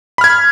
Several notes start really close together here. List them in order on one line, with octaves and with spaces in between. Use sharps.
B5 F6 G#6